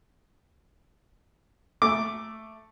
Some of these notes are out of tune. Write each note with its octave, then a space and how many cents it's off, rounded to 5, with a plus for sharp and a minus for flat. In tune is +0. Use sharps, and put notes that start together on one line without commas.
A3 +0 D6 +0